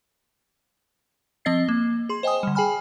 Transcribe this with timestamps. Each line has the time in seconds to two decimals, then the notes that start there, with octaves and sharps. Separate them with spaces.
1.45 F3 C4 D#5 A6 C7
1.68 A#3
2.09 G#4 C6
2.23 C5 D#5 G5 G#5 D#6
2.43 D3 G3
2.55 G#4 G5 G#5 B5 F6